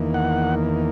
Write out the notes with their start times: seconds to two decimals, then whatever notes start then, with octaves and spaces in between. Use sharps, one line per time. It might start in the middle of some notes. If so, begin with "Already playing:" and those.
Already playing: E2 D#3 A#3
0.14 F#5